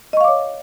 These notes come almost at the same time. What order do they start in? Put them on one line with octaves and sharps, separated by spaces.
D#5 C#6 F5 D6 C#5